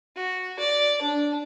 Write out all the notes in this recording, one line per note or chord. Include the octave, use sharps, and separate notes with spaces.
F#4
D5
D4